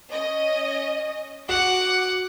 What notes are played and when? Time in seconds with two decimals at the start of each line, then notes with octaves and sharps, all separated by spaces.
0.11 C#4 D#5
1.49 F#4 F#5 D6